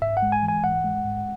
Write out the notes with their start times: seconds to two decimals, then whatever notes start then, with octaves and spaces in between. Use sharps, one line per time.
0.01 G#2 E5
0.17 F#5
0.22 G#3
0.32 G#5
0.43 E3
0.48 G#5
0.64 G#2 F#5
0.84 G#3
1.04 G#2